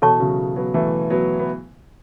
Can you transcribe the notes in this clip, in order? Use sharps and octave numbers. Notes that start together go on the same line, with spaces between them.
B2 E3 A4 C#5 F#5 A5 C#6
C#3 F#3
F#3 B3
E3 A3
F#3 B3
B3